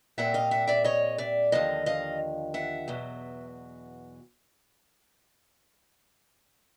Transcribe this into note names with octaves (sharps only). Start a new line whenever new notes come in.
A#2 G3 C4 E5 F#5
D#5 F5
E5 F#5
D5 E5
C#5 D#5
D5 E5
D#2 D3 F3 D#5 F5
D#5 F5
E5 F#5
E2 B2 F#3